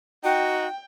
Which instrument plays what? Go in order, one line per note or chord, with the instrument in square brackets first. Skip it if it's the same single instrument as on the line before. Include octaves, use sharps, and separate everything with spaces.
[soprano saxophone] D#4 [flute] F#4 [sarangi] G5